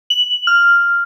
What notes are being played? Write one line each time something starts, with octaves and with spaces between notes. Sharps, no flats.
F#7
F6